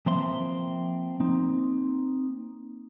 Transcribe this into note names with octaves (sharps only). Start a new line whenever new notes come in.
F3 A#3 C4 E5 C6
A#3 C4 D#4